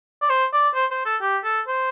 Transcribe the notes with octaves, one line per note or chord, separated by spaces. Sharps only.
D5
C5
D5
C5
C5
A4
G4
A4
C5